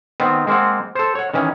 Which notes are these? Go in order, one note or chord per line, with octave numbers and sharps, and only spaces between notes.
D#3 B3 C4
G#3 A#3 C4 F#5
A4 C5
C#5 F#5
D#3 E3 C#4